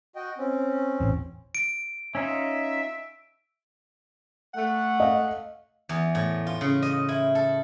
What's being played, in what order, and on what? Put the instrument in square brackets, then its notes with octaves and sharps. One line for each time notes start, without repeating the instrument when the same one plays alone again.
[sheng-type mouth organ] F#4 D#5 G5
C4 C#4
[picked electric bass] A1 E2
[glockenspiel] D7
[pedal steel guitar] C#4 D#4 F4 [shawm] E5
[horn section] A3 F#5
[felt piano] D#5 F5
[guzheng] E2
A2
F4
C#3
D#5
E4
A4